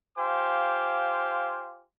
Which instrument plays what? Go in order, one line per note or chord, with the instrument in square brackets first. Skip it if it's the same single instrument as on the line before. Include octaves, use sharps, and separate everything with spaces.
[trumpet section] F4 G4 C5 F5 G#5 D6